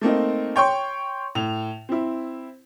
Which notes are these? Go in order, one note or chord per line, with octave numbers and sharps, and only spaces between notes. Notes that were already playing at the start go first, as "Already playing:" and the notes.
A3 A#3 C4 D#4
C#5 G5 C6 C#6
A2 F7
C4 E4